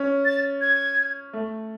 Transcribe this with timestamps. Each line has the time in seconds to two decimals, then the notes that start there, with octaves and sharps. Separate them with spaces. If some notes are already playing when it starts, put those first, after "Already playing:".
Already playing: C#4
0.25 A6
0.61 G#6
1.33 A3